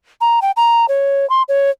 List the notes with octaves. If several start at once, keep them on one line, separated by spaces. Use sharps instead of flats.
A#5
G5
A#5
C#5
C6
C#5